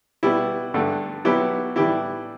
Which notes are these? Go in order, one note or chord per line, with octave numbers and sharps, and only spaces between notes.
B2 G3 B3 E4 G4
G2 D3 A3
B1 B2 F#3 B3 E4 G4
A2 E3 G3 E4 G4